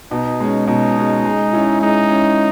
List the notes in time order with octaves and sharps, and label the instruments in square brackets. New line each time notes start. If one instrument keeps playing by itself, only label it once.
[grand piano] B2 [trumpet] D#4
[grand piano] G#3 C#4
[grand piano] B2 [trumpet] D#4
[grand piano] G#3 C#4
G#3
C#4 E4
[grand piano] G#3 [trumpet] D#4
[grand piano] C#4 E4